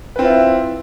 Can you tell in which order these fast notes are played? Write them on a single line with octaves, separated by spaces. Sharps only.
B4 C4 F4 E5 E4